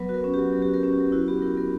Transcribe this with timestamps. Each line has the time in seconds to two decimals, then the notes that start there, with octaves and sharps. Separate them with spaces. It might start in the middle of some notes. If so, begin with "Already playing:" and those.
Already playing: F#3 B3 B4
0.09 F#4
0.14 A#4
0.24 C#4
0.34 F#3 G4
0.53 F#3
0.62 G4
0.68 F#4
0.74 A#4
0.83 C#4
0.93 G4
0.98 F#3
1.12 E4 F#4
1.28 B3 G4
1.42 E4 A#4
1.57 B3 A#4